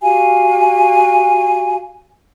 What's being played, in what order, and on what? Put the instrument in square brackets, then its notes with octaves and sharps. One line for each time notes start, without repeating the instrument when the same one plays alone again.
[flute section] F#4 G4 F5 G#5